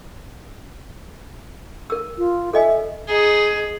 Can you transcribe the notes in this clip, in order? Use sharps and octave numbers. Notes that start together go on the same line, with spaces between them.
A#4 E6
F4
A4 D#5 E5 G#5
D#4 G#4